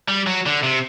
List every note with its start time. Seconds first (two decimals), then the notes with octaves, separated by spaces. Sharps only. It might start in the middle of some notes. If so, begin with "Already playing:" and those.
0.08 G3
0.27 F#3
0.46 D3
0.63 C3